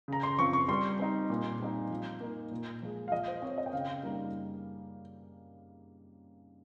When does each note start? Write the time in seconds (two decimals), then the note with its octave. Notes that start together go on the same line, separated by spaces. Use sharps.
0.08 C#3 A#5
0.23 C6
0.38 F3 C4 F4 C#6
0.53 C#6
0.68 G3 C6
0.99 C4 D#4
1.30 A#2
1.60 G3 C4 D#4
1.90 F3
2.20 A#3 D#4
2.51 A#2
2.82 F3 G#3
3.08 F5
3.12 F3 D#5
3.28 C5
3.42 C4 F4 C#5
3.58 D#5
3.66 G5
3.73 C#3 F5
4.03 G3 A#3 D#4